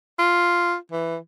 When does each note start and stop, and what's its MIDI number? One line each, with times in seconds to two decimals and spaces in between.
0.19 0.75 65
0.92 1.17 52